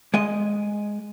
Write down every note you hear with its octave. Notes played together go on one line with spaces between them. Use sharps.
G#3 D#5